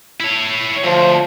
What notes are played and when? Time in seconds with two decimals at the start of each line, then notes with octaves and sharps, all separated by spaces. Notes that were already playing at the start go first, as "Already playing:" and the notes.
0.20 E4 C#5
0.84 D2 F3